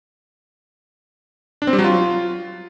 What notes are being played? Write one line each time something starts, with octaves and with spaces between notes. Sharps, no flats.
D4
C4
G3
F#3
F4